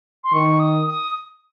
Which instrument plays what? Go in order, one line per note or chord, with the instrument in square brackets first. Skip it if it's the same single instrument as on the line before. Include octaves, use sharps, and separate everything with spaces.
[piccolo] C6
[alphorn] D#3 [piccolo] C#6
[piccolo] D#6
D#6